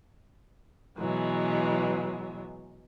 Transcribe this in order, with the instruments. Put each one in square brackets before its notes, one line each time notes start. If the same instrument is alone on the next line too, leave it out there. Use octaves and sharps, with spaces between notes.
[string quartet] B2 E3 F#3 G#3